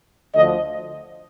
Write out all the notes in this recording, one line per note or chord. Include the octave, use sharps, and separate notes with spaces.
D2 D3 F3 D#5